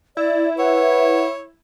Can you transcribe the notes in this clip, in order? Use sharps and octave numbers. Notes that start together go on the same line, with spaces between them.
E4 D5
B4 C#5 F#5